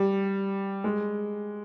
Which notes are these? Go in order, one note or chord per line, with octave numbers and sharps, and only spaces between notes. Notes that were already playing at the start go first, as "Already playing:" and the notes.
Already playing: G3
G#3